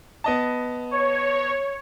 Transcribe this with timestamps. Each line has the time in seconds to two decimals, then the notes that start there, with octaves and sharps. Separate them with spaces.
0.24 B3 D#5 A5
0.91 C#5